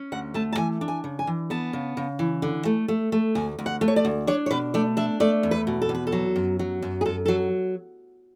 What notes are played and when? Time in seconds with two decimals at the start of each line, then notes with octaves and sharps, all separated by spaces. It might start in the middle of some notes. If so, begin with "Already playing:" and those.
Already playing: C#4
0.12 D2 F#5
0.34 A3 A5
0.53 A5
0.57 E3 G#5
0.81 D4
0.88 G#5
1.04 C#3
1.19 G#5
1.27 E3
1.50 B3 A5
1.73 C#3
1.97 C#3
2.19 E3
2.42 D3
2.65 A3
2.88 A3
3.12 A3
3.35 D2 G#5
3.59 D2
3.66 F#5
3.81 A3
3.88 C#5
3.96 D5
4.05 D2
4.27 D4 C#5
4.46 C#5
4.51 B2 B4
4.74 A3 D5
4.97 D4 E5
5.20 A3 D5
5.43 E2
5.51 B4
5.67 B2
5.82 A4
5.89 E2
5.95 B4
6.07 A4
6.12 F#3
6.36 F#2
6.59 F#3
6.82 F#2
7.01 G#4
7.05 F#2 A4
7.26 F#3 A4